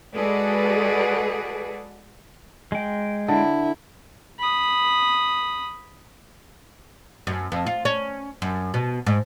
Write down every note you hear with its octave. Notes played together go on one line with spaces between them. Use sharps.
G#3 F#4 G#4 A4 B4 D5
G#3 G5
D3 E4
B5 D#6
F#2
F2
F4
C#4
F#2
B2
G#2